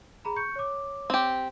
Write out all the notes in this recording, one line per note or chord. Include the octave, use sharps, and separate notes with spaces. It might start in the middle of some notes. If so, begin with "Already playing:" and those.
G#4 A#5 B5
C#6 G6 C#7
C#5 D6
C4 G4